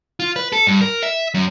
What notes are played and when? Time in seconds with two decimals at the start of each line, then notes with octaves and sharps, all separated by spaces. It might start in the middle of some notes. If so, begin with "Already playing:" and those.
0.20 F4
0.36 B4
0.53 A4
0.67 G2
0.81 A#4
1.03 E5
1.34 F#2